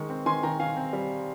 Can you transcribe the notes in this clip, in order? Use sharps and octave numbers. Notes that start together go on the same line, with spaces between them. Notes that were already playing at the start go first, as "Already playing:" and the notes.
Already playing: D#3 G#3 C#6
C4
D#3 G#5 C6
D#3 G5 A#5
D#3 F5 G#5
C4
G3